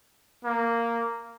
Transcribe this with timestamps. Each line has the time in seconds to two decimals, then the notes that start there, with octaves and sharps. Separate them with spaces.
0.45 A#3